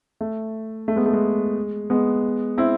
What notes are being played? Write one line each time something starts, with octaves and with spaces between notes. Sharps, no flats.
A3
A3
G#3 B3
A3
G#3
G#3 B3
C4 E4